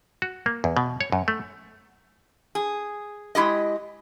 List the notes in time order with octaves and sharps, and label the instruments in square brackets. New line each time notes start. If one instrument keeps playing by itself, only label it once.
[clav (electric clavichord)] F#4
A#3
E2
B2
C#5
F#2
A3
[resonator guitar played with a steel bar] G#4
G#3 E4 G4 D#5